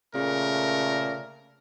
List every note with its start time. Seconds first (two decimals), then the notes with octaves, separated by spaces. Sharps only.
0.15 A#2 C#3 A3 A#4